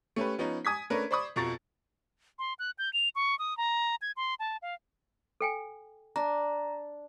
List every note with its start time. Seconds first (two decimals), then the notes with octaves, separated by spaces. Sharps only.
0.16 A3 C#4 G4 B4
0.38 F3 B3 C#4 D#4
0.65 G#5 D#6 G#6 B6
0.90 A3 C#4 D4 A#4 B4
1.11 C5 D5 B5 C#6 D#6
1.36 F2 B2 F3 A#5 C#6 A6
2.39 C6
2.59 F#6
2.78 G6
2.93 F7
3.15 C#6
3.39 D#6
3.57 A#5
4.02 G#6
4.17 C6
4.40 A5
4.62 F5
5.41 A4 G5 G#5
6.16 D4 A#5